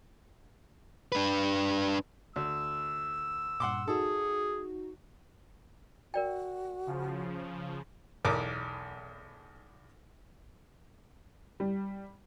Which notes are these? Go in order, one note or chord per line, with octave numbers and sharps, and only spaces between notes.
D4 B4
D2 E6
G2 A#2 F#5 C6 D6
D#4 F#4 G#4 A4
F#4 A#4 D5 G5
C#3 F3
B1 E2 A#4 D6
G3